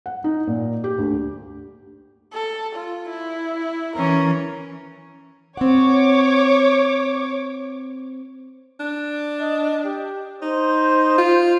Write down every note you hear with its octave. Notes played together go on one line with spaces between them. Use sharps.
F#5
D#4
A#2
G4
D2
A4
F4
E4
E3 C#4 A#4
C4 C#5 F#5 D6
D4
D#5
G4
D#4 C5
F4